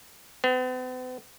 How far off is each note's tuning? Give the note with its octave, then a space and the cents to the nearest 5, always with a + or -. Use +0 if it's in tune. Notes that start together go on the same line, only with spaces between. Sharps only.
B3 +45